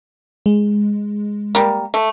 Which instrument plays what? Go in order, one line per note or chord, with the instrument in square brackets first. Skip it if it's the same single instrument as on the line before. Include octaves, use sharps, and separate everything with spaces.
[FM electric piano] G#3
[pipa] G3 A#3
A3